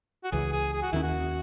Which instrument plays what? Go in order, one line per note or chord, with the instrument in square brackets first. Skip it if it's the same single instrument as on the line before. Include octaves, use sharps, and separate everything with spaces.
[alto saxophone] F#4
[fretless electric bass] C#2 C#3 E3 [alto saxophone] G#4
[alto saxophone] G#4
G#4
F#4
[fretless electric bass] D#2 D#3 A#3 C#4 [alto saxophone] E4
[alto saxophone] F#4